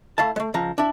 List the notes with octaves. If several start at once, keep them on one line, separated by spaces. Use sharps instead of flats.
A3 E4 F5 A5
G#3 A3
C#2 F3 A#5
D4 E4